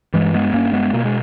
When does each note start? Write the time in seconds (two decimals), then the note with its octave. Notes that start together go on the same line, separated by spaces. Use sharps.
0.14 G2 E3 G#3
0.34 G#3 B3
0.54 G2 A#3 C#4
0.73 G#3 B3
0.93 B2 A#3
1.05 G#3